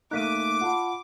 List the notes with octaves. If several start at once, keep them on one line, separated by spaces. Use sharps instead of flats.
A3 A#3 D#4 D6 F#6 B6 D#7
F4 F#5 A5 B5